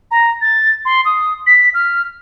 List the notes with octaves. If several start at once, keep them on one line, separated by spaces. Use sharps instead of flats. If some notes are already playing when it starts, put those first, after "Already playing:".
A#5
A6
C6
D#6
B6
F6